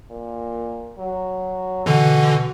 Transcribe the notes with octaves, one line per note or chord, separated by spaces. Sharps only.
A#2
F#3
B2 D3 E3 F#4